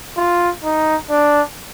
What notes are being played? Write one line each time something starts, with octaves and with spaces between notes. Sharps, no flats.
F4
D#4
D4